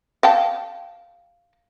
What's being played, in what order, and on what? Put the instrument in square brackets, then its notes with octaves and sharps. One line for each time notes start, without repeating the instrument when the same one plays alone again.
[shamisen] F5 G5 A5